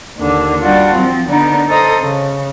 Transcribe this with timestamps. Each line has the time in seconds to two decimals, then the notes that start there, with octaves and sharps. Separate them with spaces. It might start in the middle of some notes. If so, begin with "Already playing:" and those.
0.17 D#2 D3
0.61 G3 D4 F4 F#4
0.97 F3 C4
1.28 D3 B3 D4 D#4
1.69 A4 C5 D#5 A#5 D#6
2.00 C#3